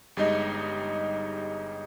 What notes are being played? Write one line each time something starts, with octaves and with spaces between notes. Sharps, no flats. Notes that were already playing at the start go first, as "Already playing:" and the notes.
G1 G3 G#3 D#4 D#5